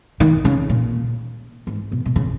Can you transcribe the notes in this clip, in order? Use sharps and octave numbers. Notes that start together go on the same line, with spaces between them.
D#3
C#3
A#2
G#2
B2
B2
C#3